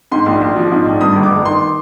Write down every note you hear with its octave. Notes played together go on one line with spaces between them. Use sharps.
G#2 C6
A#1
A#1
F3
G#2
A#1
G2 D#6
G1
D6
G1
D#3 C6